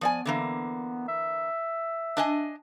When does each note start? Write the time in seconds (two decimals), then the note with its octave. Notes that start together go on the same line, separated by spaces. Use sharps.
0.01 F3 B3 D5 G#5
0.26 D3 E3 A#3
1.08 E5
2.17 D4 D#5 G#5